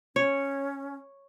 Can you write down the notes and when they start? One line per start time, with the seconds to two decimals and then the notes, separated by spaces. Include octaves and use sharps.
0.16 C#4 C#5